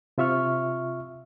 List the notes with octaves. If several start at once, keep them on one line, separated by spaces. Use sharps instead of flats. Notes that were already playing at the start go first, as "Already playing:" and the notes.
C3 F4 E5 C#6 F6